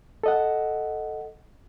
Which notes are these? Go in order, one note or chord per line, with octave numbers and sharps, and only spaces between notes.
A4 D#5 F#5